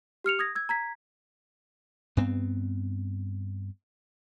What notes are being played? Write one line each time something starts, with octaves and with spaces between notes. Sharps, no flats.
G4 F6 C#7 F7
D#6 G#6 A#6
E6 G#6
A#5 G#6 B6
G2 B3 C4